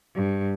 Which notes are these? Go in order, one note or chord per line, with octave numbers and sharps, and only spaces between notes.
G2